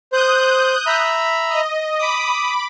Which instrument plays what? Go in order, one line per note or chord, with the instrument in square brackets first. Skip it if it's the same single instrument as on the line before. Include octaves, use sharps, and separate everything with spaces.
[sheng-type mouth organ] C5 [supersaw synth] D#6 F#6 G6
[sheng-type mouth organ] E5 A#5 B5
[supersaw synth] D#5
[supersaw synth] B5 D6 [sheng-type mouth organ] D#6